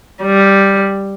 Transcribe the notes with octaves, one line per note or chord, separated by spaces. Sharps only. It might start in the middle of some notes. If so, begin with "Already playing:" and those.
G3